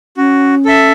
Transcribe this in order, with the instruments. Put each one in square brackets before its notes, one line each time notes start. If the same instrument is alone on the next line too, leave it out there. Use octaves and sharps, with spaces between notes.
[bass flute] C#4 [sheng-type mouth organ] F#4
[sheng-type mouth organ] A4 E5